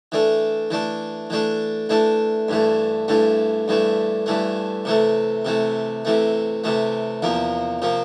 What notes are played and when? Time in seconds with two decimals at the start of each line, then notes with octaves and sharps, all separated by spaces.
0.12 E3 A3 D4
0.71 E3 A3 D4
1.30 E3 A3 D4
1.89 E3 A3 D4
2.49 G2 E3 A3
3.08 G2 E3 A3
3.68 G2 E3 A3
4.26 G2 E3 A3
4.85 C3 E3 A3
5.45 C3 E3 A3
6.05 C3 E3 A3
6.64 C3 E3 A3
7.22 E2 C3 F3 A#3
7.82 C3 F3 A#3